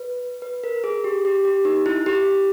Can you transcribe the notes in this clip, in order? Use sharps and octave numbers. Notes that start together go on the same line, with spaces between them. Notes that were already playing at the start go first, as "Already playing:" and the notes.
Already playing: B4
B4
A#4
G#4
G4
G4
G4
D#4
E4
G4